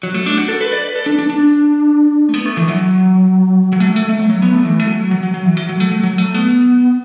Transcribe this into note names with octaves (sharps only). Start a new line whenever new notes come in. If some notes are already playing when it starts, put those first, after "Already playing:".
F#3
A3
D4
F#4
A4
B4
D5
B4
A4
D4
D4
D4
A3
B3
A3
E3
F#3
F#3
A3
F#3
A3
A3
F#3
F#3
B3
A3
E3
A3
F#3
F#3
F#3
F#3
E3
F#3
F#3
A3
F#3
F#3
A3
B3